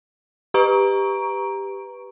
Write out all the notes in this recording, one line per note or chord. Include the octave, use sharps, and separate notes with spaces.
G4 B4 A#5 C#6 D7